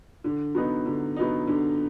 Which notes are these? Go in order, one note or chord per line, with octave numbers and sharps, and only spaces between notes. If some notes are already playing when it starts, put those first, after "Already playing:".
D3
F#3 B3 D#4
D3
F#3 B3 D#4
D3